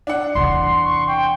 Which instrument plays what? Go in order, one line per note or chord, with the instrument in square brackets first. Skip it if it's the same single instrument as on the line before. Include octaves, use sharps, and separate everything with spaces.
[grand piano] D4 F#5
[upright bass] E2 C3 [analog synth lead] C6
[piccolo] C#6
G5